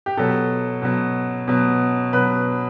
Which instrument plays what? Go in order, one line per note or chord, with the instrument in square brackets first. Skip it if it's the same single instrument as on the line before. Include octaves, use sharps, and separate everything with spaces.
[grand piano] G4
B2 F#3 A4
B2 F#3
B2 F#3
B2 F#3 B4